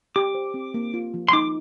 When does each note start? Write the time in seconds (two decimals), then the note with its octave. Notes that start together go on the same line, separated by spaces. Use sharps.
0.16 G4 D6
0.35 C5
0.54 C4
0.74 A#3
0.94 F4
1.14 F3
1.29 C6
1.33 D#4 D6